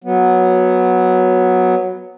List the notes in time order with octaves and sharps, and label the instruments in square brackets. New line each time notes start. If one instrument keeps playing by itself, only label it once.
[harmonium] F#3 B3